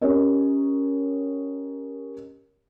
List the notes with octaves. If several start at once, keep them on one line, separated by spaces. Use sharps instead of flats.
C#4 G4 A#4 C#5 D#5